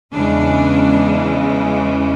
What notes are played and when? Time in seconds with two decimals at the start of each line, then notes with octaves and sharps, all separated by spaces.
0.14 E2 C#3 E3 G#3 C#4 D4